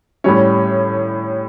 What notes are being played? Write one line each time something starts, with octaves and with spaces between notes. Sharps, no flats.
A2 G3 C#4